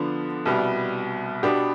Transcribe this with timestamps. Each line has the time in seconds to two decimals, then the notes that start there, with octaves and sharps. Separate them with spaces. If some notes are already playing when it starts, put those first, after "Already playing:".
Already playing: D3 F3 B3 D4
0.46 C2 B2 G3
1.43 B2 B3 D4 G4